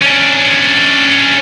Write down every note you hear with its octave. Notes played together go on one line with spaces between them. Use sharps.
C#4 D4